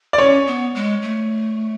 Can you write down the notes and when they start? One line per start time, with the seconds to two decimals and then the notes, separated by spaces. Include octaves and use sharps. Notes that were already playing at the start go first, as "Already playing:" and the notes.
0.13 D5
0.18 C#4 C#5
0.47 B3
0.75 G#3
1.02 A3